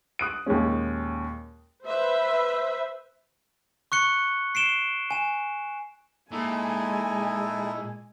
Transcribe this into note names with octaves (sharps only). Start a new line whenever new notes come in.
D#6 F#6 D7
D#2 A#2 G#3 C#4
B4 C5 E5
C#6 F#6 C#7 G7
C7 D7 E7 G7
G#5 E7
A#2 G#3 D#4 E4 A4 G#5